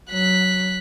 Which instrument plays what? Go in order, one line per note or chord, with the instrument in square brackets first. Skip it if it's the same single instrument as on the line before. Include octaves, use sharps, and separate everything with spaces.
[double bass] F#3 [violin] F#6 B6